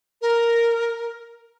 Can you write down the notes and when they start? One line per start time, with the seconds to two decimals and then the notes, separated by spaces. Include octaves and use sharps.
0.22 A#4